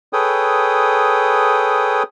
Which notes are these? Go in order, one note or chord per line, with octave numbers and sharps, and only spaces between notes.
G#4 A4 B4 C#5 G5 D#6